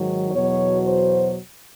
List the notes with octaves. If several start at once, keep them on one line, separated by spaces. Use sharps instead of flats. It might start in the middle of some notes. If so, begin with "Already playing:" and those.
Already playing: G#2 D#3 F#3
E2 B2 F#3 C#5
C5